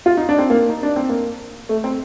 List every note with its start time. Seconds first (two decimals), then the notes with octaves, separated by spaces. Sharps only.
0.06 F4
0.17 D#4
0.29 D4
0.38 C4
0.50 A#3
0.69 D#4
0.83 D4
0.96 C4
1.09 A#3
1.69 A3
1.84 C4